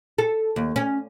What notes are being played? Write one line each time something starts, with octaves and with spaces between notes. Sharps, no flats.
A4
D#2
C#4